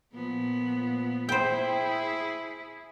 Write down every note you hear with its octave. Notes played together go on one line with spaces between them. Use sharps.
A#2 F3 B3
E4 G#4 C5 G5